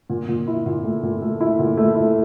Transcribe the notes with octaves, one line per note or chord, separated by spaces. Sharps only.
A#2
A#2
E4
A#2
A3
A#2
A3
E4
A#2
A3
E4